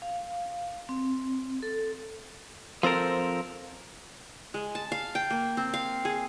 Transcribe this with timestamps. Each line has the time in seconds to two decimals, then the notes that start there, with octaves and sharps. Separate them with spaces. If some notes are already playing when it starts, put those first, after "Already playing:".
0.02 F5
0.89 C4
1.62 A4
2.83 F3 C4 A4 A#4
4.54 G#3
4.75 A5
4.92 F5
5.15 G5
5.30 A#3
5.57 C4
5.74 F5
6.05 G#4